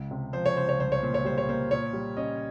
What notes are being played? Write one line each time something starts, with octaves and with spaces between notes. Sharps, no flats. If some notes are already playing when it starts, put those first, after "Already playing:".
Already playing: C#2
C3
F3 C5
C#5
C#2 C5
C#5
C2 C5
C#5
A#2 C5
C#5
G3 C5
C#5
A#3 C5
A#2 C#5
G3
C#4 D#5